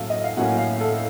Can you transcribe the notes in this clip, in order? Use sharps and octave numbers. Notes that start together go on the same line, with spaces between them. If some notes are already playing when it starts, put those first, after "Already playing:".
Already playing: A2 F#3 A#3 C#4 A4 F5
D#5
F5
A2 F#3 A#3 C#4 F#5
F5
A4